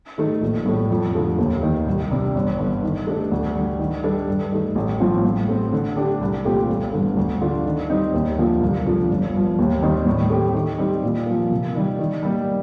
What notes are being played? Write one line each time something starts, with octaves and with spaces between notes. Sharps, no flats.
D#3 A3 D#4
A#1
A2 A3
F2
D3 F3 A3
D#2
D#3 A#3
C2
C3 G3 D4
G1
G2 D3
D#3
A3 D4 A4
D2
D3 G3
D#3
G3 D4 A4
G2
D#3 A3
A1
A2 F3 C4 F4
A2
A3 C4
D3
A3 D4 G4
C2
A#2 A3 C4 G4
G1
G2 D3 A3
D2
D3 A3 D4 F4
D#3
G3 C4 D#4
D#2
D3 F3 A#3
C2
C3 F3 A3 D4
G1
G2 F3
D#2
D#3 G3 C4 D#4
A2
A3 C4 G4
D#3
G3 C4 D#4 G4
A#2
F3 A#3
C3
D#3 G3
D#3
G3 A#3